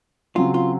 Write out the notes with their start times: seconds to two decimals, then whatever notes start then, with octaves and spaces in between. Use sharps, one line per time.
0.35 C#3 F#3 C4 F4
0.54 F4